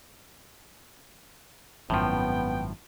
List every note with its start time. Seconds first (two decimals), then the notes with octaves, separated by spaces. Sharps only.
1.90 G#1 F#2 A2 F3 B3 G5